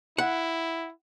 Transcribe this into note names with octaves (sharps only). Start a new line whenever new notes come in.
E4 F#5